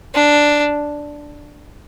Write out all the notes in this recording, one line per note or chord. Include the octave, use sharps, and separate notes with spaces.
D4